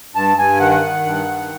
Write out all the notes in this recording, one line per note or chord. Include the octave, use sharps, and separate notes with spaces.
G2 A5
G2 G#5
D#3 F#5
D#3
G2
D#3